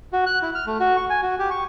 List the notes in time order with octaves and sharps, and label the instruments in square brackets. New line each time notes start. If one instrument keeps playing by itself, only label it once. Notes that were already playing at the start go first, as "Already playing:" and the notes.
[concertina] F#4
F#6
E4
F6
A3
F#4
C#6
G#5
F#4
G4
C#6